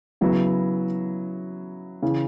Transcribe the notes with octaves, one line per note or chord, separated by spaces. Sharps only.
C#3 F#3 B3 E4
C#3 E3